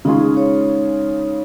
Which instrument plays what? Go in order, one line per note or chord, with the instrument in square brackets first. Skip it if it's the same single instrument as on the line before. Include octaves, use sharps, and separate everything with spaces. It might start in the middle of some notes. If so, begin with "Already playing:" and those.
[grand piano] C#3 G#3 C#4 F4 G#4 [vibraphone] D#4
[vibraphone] C#5